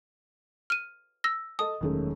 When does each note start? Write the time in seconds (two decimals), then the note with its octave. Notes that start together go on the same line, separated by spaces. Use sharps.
0.70 F6 D#7
1.24 E6 A#6
1.59 A4 D#5 A5 D#6
1.81 E1 F#2 D#3 G#3 A3 C#4